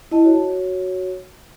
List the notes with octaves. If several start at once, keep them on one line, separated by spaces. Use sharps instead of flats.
E4 D#5 A5
F#4 C#5